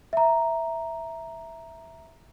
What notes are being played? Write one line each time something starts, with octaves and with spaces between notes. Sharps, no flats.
E5 A#5